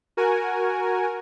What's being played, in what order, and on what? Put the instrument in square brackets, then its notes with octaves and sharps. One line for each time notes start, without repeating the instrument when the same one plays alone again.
[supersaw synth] F#4 A#4 G#5